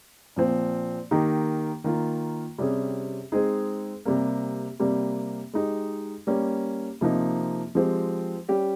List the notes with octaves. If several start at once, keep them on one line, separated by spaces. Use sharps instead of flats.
A#2 F3 C4
D#3 A#3 D#4 G4
D#3 A#3 F4
C3 G3 C#4 G#4
G#3 C4 D#4 G#4
C3 G3 A#3
C3 G3 A#3
G#3 D#4 G4
G3 A#3 C#4 G4
C3 F3 A#3 D#4
F3 G#3 C4 G4
G3 C#4 G4